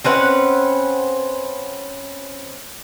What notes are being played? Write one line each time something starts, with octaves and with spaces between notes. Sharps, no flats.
C4 C#4 B4 F#5